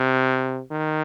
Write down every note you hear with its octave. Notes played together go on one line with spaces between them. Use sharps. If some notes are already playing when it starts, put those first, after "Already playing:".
Already playing: C3
D#3